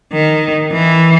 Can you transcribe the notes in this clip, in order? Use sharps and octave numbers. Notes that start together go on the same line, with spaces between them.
D#3
E3